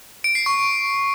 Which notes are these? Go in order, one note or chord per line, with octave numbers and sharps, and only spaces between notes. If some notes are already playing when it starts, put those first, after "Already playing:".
D7
C7
C#6